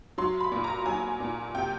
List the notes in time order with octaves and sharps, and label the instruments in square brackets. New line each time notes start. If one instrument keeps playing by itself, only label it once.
[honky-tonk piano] F#3 C6
B5
A#2
A#5
F#3 G#5
A#2
C3 G5